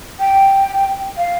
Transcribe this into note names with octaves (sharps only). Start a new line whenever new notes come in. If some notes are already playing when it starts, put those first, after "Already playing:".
G5
F5